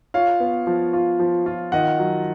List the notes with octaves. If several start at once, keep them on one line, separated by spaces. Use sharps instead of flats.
F4 C#5 F5
B3
F3
F4
F3
F4
D#3 D#5 F#5
F#3